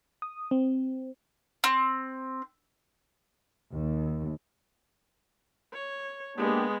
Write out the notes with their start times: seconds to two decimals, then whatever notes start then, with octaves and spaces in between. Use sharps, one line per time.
0.22 D#6
0.51 C4
1.64 C4
3.71 D#2
5.73 C#5
6.37 G#3 A#3 B3 D4 G4